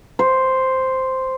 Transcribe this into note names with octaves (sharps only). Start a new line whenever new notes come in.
C5